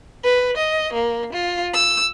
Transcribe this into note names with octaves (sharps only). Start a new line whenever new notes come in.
B4
D#5
A#3
F4
E6